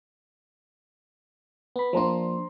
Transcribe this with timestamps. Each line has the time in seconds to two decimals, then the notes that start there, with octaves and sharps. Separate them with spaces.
1.76 B3 B5
1.93 F3 A#3 D4 C5 A#5 C6